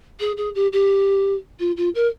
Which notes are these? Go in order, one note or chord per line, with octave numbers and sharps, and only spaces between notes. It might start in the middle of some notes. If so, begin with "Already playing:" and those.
G#4
G#4
G4
G4
F4
F4
A#4